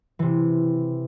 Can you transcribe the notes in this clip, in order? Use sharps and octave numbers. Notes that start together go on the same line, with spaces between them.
C3 E3